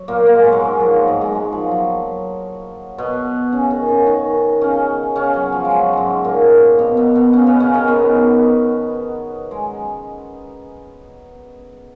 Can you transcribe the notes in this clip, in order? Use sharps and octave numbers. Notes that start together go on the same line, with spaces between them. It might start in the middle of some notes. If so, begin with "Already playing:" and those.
Already playing: F#3
A#2 A#3
A#3
G#3
F#3
G#2 G#3
F3
F#3
G#2 G#3
G#2 G#3
F#3
F3
F#3
B2 B3
C#3 C#4
D#3 D#4
C#3 C#4
D#3 D#4
C#3 C#4
C#3 C#4
F#3
F3
G#3
F#3
G#2 F#3 G#3
A#2 A#3
B2 B3
B2 B3
B2 B3
C#3 C#4
B2 B3
C#3 C#4
D#3 D#4
B2 B3
G#3